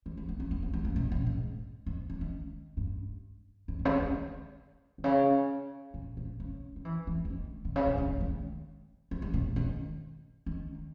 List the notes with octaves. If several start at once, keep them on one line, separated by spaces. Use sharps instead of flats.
D#3
A#3
B3
C#4
B3
A#3
B3
A#3
B2
A#2
G#2
G#2
E3
D#3
G2
G#2
G#2
C#3
B2
D#3
B2
C#3
A#2
A#2
C#3
G3
E3
E3
E3
D#3
B2
C#3
B2
C#3
D#3
D#3
E3
G3
B2
D#3
D#3